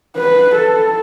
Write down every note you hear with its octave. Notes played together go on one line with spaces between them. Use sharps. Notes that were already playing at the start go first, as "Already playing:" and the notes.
B4
A4